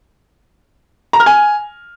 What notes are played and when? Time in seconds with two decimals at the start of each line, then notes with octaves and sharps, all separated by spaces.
1.13 A#5
1.20 F6
1.26 G#5